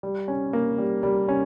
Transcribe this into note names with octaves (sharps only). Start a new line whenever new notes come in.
G3
C#4
A#3
G3
G3
C#4